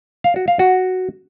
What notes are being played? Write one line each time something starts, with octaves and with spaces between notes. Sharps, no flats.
F5
F#4
F5
F#4